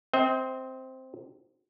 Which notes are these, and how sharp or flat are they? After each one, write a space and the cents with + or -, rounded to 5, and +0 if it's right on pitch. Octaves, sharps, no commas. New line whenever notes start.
C4 +0 D#5 +45